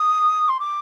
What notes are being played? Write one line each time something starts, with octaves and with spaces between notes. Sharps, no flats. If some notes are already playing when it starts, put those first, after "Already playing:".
Already playing: D#6
C6
D6